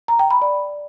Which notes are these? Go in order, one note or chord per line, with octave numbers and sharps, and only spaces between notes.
A#5
G5
B5
D5